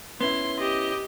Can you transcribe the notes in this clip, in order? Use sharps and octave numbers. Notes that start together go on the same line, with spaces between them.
B3 C#4 E4 C6
G4 D#5